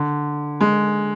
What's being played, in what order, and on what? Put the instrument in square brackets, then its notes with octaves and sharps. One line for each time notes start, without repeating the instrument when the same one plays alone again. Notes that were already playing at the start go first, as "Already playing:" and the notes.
Already playing: [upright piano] D3
G#3